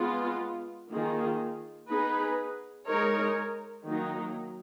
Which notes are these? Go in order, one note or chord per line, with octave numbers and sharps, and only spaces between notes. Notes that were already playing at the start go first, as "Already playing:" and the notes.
Already playing: G#3 B3 F4
D#3 A#3 F4 G#4
B3 D#4 G#4 B4
G#3 D#4 A#4 C#5
D#3 F#3 A#3 D#4